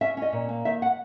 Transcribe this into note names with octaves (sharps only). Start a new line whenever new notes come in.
C#4 E5
C#4
D#5
A#2
A#3
D#3 E5
F#5